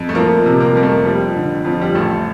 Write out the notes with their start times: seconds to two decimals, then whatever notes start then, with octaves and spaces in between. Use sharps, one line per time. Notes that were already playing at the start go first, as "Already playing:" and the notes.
Already playing: F2
0.09 A3
0.15 F3 A#3
0.46 C3
0.60 A#3
0.75 F2 A#3
0.83 A3
1.05 F3 G3
1.36 D3
1.65 F2 F3
1.81 G3
1.95 A1 A3